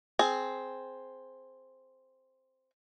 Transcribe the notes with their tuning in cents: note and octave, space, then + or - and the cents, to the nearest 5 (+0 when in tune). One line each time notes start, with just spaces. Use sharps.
C4 +0 G#4 +15